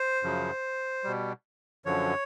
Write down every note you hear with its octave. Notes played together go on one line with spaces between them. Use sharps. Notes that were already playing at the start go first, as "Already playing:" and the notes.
Already playing: C5
F#2 C#3 F3
B2 G3
F#2 D3 F3 C#5